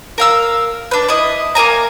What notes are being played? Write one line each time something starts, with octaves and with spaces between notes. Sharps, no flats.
A#4 F5 E6
D4 B4
E4 D#5
A#3 A#4 G#5 A#5